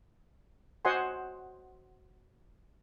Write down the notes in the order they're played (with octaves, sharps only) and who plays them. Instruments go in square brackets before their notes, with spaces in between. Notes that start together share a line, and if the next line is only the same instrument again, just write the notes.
[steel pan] F#4 C5 D#5 F#5 G#5 C6